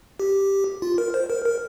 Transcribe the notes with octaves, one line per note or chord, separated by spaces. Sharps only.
G4
F4
A#4
C5
A#4
A#4